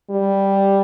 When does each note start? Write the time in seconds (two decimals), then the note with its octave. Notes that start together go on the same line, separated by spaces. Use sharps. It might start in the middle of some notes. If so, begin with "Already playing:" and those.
0.11 G3